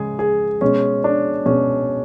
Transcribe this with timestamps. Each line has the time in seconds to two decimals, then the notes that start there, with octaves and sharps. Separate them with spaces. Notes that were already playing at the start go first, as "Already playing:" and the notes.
Already playing: C#3 G#3 G#4
0.19 G#4
0.61 B2 G#3 C#4
1.04 D4
1.46 B2 G#3 C#4